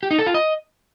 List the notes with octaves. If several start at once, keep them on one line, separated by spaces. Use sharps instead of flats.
G4
D#4
A4
F4
D#5